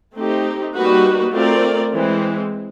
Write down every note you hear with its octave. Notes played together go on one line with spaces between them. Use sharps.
A3 C4 D#4 G4
G3 A#3 D#4 F#4 B4
A3 C4 F4 A#4 D5
E3 G#3 C4